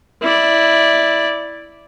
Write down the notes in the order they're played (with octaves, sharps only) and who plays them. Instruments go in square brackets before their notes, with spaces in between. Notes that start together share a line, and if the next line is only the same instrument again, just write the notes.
[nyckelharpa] E4 D5